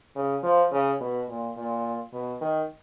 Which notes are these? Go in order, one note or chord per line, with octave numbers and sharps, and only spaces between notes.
C#3
F3
C#3
B2
A#2
A#2
B2
D#3